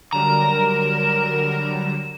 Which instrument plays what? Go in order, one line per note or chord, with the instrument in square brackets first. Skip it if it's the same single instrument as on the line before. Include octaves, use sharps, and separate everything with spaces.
[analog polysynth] D3 F#3 G3 [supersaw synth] A#4 [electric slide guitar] A#5 [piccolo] E7